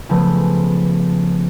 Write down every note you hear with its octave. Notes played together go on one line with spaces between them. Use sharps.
C#3 F3 A3 B3